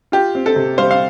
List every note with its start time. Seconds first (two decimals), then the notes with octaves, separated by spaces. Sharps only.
0.12 F4 G4
0.35 C4
0.46 A4
0.56 C3
0.78 G3 C5 F5
0.91 F5